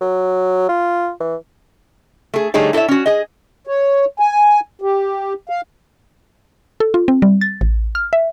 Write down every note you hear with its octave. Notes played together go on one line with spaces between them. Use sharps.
F#3
F4
E3
A3 G#4
D3 G3 A3 D#4 G#4 C#5
E4 A4 C5 C#5 E5
C#4 F#4
G#4 D#5
C#5
G#5
G4
F5
A4
F4
C4
G3
A6
A1
F6
E5